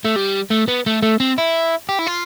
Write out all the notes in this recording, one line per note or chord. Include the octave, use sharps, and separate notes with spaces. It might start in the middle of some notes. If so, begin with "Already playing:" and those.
A3
G3
A3
B3
A3
A3
C4
E4
G4
E4
F4